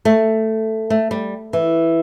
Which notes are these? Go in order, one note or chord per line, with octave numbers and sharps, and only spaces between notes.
A3
A3
G3
E3